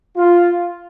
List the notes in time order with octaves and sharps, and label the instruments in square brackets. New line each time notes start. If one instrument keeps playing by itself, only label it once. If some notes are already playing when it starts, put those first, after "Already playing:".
[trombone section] F4